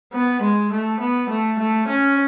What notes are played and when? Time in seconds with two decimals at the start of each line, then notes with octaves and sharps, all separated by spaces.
0.13 B3
0.42 G#3
0.72 A3
1.00 B3
1.30 A3
1.59 A3
1.88 C#4